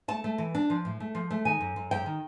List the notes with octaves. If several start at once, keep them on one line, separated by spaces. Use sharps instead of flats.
A3 A5
A3
E3
D4
F3
A2
A3
F3
A3
D#3 G#5
F#2
F#2
F#2 G5
D#3